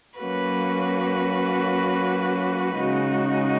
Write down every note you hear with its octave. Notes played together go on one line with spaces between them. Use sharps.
F#3 A#3 C#4 F#4 B4
C#3 G#3 D#4 F#4